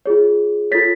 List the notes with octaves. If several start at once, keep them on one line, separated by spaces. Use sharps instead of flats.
F4 G#4 C#5
F4 A4 C#5 A6 B6